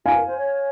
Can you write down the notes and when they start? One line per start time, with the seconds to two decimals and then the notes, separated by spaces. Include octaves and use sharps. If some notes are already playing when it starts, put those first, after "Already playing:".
0.05 F#4 F5 G#5
0.15 A#4
0.26 C5
0.37 C#5